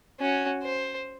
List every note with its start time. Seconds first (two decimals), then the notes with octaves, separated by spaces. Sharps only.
0.20 C#4 F#4
0.63 C5